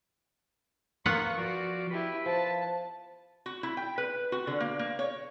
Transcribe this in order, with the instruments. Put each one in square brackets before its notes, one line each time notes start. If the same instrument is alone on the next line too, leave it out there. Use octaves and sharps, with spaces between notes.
[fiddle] A#3 C#6 [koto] B3 F4 F#5
[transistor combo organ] F3 D5 [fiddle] F#4
[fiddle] E4 G4 [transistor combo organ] B4
[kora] F3 [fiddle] A5
[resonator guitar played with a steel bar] F#4
E4
G5
B4
F#4
D3
A#3
A#3
C#5